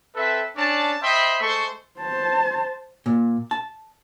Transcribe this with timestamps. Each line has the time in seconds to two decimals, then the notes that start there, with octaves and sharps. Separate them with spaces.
0.16 C4 A4 B4 E5
0.57 C#4 D4 D5 A5
1.02 C5 D#5 E5 G5 B5 C6
1.41 G#3 A3 A4 C5 C6 C#6
2.00 C5 A5
3.06 A#2
3.51 A5